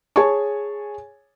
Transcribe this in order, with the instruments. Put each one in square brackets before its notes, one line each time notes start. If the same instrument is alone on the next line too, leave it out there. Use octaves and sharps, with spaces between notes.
[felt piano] G#4 C#5 G#5 A5 C#6